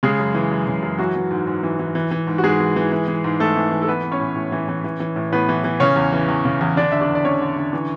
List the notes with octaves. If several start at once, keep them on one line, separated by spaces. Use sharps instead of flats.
C#3 G#3 G#4
F#2
E3
F#2
C#3
F#2
E3 F#3 F#4
E3
G#2
G#2
E3
E3
E3
E3
G#2
F#4
G#2 G#3 G#4
E3
E3
E3
E3
G#2
G#2 A3 A4
E3
E3
A4
E3 B3 B4
E3
C#4 C#5
A2
A2
E3
E3
E3
E3
A2
A2 B3 B4
E3
E3
C#3 C#4 C#5
E2
E3
E2
C#3
E2
D3 D4 D5
D3 E5
D4 D5
E2
D5
E2 C#4 C#5
D3
D3
E3